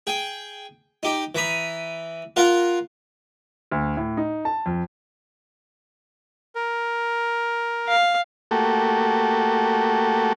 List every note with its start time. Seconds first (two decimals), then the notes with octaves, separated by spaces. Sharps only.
0.07 G#4 G5
1.03 D#4 G4
1.35 E3 A#5 B5 D#6
2.36 F4 A#4 F5 F#5 A#5
3.71 D2
3.97 A2
4.17 D#4
4.45 A5
4.66 F2
6.55 A#4
7.88 F5
8.51 A3 A#3 F#4 G4 A4